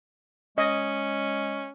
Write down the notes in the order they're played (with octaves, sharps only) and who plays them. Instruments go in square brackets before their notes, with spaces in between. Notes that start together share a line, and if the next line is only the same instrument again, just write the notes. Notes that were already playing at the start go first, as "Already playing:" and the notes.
[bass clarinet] G#3 [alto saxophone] C#4 [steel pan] D#5